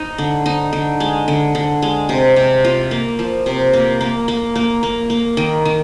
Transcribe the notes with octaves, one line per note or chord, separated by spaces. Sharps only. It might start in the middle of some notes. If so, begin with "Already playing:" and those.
Already playing: D#4
D3
D#4
D3
G#3
D3
D3
G#3
C3
C3
F4
A#3
F3
C3
A#3
A#3
A#3
A#3
A#3
A#3
D#3
D#3